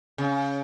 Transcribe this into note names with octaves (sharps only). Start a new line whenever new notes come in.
C#3